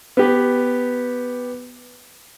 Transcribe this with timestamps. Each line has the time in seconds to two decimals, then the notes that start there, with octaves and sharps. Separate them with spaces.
0.17 B3 G4 B4